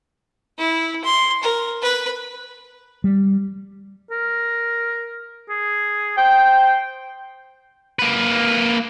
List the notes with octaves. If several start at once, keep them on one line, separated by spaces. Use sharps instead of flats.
E4
C6
A#4
B4
G3
A#4
G#4
C5 G5
A#3 B4